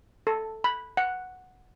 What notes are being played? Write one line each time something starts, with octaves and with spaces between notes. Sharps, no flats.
A4
B5
F#5